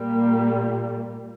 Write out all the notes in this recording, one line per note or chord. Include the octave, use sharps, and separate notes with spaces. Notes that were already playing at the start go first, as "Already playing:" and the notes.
Already playing: A#2 G3 A#3